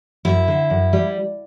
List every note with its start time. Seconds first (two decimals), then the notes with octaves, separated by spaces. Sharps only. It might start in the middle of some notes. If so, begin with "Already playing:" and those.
0.25 F#2 E4
0.48 D3
0.70 F#2
0.93 G3